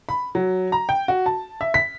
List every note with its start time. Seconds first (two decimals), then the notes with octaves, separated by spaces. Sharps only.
0.09 B5
0.35 F#3
0.72 A#5
0.89 G5
1.08 F#4
1.26 A5
1.61 E5
1.74 B6